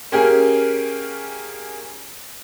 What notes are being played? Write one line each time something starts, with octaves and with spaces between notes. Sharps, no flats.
A#3 C#4 G4 G#4 A#4